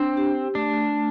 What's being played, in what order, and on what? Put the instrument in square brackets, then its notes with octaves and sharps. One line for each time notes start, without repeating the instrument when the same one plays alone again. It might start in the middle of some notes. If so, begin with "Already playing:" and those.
Already playing: [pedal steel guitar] C4 [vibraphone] D4
[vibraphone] G4
[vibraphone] A3 [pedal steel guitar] D4
[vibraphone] A3